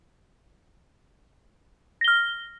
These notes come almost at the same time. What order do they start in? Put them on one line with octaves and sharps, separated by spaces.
A#6 G7 F6